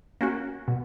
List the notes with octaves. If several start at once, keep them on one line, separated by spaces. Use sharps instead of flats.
A#3 C#4 F#4
B2